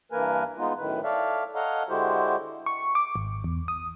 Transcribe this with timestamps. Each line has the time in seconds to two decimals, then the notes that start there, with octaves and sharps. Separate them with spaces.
0.12 G2 E3 A#3 A#4 B4 G#5
0.58 G#3 B3 D#4 F4
0.78 F#2 A2 D#3 B4
1.04 A4 C#5 D5 E5 F5
1.55 A4 C#5 D#5 F5 F#5 A#5
1.89 D3 G#3 E4 F#4 G4 C5
2.66 C#6
2.95 D6
3.15 G#1
3.44 E2
3.68 D#6